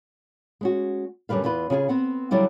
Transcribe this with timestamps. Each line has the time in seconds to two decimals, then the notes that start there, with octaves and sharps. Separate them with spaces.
0.61 G#3 C#4 F#4
1.29 F#2 D3 G3 B4 F5
1.44 E2 E4 F4 B4
1.70 C#3 F4 G4 G#4
1.89 B3 C4 F#5
2.31 D3 F#3 G3 E4 F4